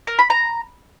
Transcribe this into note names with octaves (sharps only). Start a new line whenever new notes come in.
A#4
B5
A#5